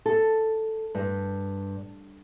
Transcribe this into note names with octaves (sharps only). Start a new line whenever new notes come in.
A4
G2